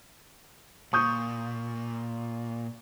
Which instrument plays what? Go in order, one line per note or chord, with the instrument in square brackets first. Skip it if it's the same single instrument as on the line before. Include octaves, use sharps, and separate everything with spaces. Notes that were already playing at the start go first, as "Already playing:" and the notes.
[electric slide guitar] A#2 [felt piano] C#6 D#6 G6